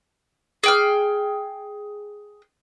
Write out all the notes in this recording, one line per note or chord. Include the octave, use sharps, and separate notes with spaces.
G#4 G5 F6